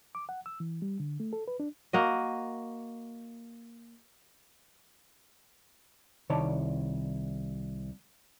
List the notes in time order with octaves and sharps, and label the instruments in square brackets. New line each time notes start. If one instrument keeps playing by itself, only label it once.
[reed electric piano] D6
F#5
E6
E3
G3
D3
A3
A4
B4
D4
[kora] A#3 F#4 D#5
[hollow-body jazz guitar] C2 D#3 C#5 D5 A5